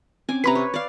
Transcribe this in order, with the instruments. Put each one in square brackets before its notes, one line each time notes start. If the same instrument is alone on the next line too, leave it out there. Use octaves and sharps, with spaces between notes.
[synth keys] C4 C#4 [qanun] G#5 D6
[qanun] C3 B4 [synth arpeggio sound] A#5 B5 B6
[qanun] C#5
D5 F5